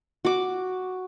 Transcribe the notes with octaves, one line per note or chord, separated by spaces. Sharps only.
F#4 D6